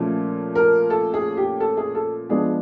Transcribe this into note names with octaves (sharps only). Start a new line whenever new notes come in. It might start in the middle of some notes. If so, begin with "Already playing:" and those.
Already playing: A#2 F3 A3 C#4
A#4
A4
G#4
G4
A4
G#4
A4
F3 G#3 B3 D4 G#4